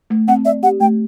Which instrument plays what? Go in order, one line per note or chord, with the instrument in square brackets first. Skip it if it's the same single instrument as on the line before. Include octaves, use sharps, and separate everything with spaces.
[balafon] A3
[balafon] C4 [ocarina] F#5
[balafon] D5 [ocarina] E5
[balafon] G4 [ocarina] F#5
[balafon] A3 [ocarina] G5